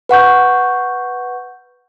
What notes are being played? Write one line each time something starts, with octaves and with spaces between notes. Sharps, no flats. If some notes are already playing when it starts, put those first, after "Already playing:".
B4 F#5 C#6 G6